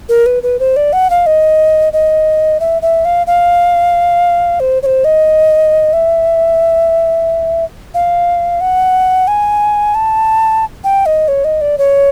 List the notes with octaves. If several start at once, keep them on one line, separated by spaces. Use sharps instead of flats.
A#4
B4
B4
C5
D5
F#5
F5
D#5
D#5
E5
E5
F5
F5
C5
C#5
C5
D#5
E5
F5
F#5
G#5
A5
G5
D#5
C#5
D#5
D5
C#5